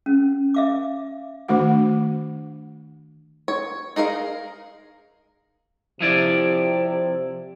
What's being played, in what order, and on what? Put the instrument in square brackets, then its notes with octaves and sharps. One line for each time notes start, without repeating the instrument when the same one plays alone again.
[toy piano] C#4
E5 F5 D6
[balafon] D#3 A3 D4 F#4 F#5
[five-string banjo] C#5
D#4 G#4 A#4 F5
[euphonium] C3 [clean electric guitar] F3 E4 D5